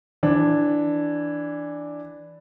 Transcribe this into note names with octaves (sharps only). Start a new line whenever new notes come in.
E3 D4